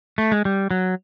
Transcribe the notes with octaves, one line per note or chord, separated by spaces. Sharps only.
A3
G#3
G3
F#3